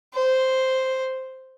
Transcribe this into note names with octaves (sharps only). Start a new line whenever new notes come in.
C5